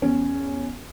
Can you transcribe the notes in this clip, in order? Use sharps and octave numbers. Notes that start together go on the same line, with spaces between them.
E2 C#4